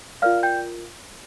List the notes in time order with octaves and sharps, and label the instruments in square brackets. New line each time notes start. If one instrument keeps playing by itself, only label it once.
[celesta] F4 A#4 D5 F5 F6
G5 G6